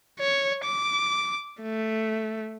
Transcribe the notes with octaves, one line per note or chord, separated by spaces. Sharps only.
C#5
D6
A3